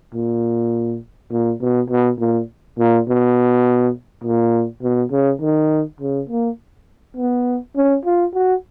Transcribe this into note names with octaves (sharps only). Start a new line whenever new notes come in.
A#2
A#2
B2
B2
A#2
A#2
B2
A#2
B2
C#3
D#3
C#3
A#3
B3
C#4
F4
F#4